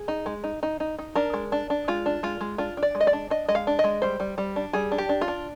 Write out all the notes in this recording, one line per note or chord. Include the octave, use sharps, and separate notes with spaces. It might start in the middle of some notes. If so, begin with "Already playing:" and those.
Already playing: G#4
D#4
G#3
D#4
D#4
D#4
D#4
D4 A#4
G#3
D4
D4
G#3 F4
D4
G#3 F4
G#3
D4 F4
D4
D5
G#3
D#5
D5
D4
D4 D#5
G#3 D#5
F5
D4
G#3 D#5
G3 C5
G3
G3
D4
G3 G#4
D4
G4
D4
F4
D4